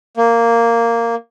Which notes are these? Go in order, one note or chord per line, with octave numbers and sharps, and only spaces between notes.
A#3